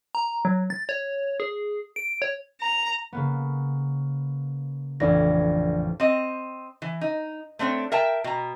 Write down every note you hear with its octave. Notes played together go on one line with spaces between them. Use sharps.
A#5
F#3
A6
C#5
G#4
D7
C#5
A#5
C#3 A#3 B3
A1 F2 D4 D5 A#6
C4 D#5
E3
D#4
A3 C4 D4 C#5
A#4 E5 G5 A5
B2 A#5